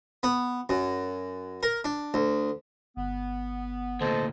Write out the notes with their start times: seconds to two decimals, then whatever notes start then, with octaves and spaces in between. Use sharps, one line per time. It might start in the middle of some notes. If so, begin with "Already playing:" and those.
0.23 B3
0.69 F#2
1.63 A#4
1.85 D4
2.14 D2
2.97 G1 B3
4.01 D2 A#2 A4 C5 D#5